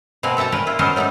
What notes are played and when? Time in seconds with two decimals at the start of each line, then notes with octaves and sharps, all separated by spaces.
0.23 B2 A#3 C4 A#4 B4 G#5
0.37 A4 E5 G5 A5 A#5
0.52 A#2 A#4 B4 C#5 G5
0.67 E4 F4
0.79 F#3 B3 C#4 D#4 A#4 C5
0.96 F#3 A3 B3 C#4 D#4